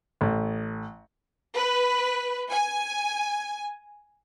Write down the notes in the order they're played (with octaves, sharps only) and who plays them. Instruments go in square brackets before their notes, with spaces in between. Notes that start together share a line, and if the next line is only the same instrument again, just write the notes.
[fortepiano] A1
[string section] B4
G#5